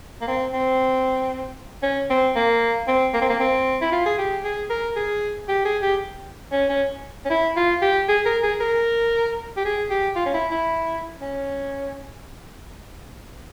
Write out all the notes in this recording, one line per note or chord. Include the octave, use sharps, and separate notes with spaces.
A#3
C4
C4
C#4
C4
A#3
C4
A#3
C4
A#3
C4
E4
F4
G#4
G4
G#4
A#4
G#4
G4
G#4
G4
C#4
C#4
C#4
E4
F4
G4
G#4
A#4
G#4
A#4
G4
G#4
G4
F4
C#4
E4
E4
C#4